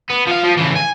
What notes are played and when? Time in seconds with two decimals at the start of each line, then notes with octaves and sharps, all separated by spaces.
0.10 B3
0.27 F3 F5
0.44 F3
0.57 C#3 E3
0.77 G#5